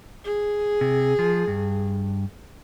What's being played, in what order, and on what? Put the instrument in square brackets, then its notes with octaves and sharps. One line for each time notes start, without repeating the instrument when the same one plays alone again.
[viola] G#4
[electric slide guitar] C3
F3
G2